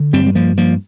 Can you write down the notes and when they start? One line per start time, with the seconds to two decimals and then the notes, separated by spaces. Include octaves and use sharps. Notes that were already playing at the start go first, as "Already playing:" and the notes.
Already playing: D3
0.13 G2 G3 C4
0.27 G3
0.35 G2 F3 A#3
0.57 G2 F3 A#3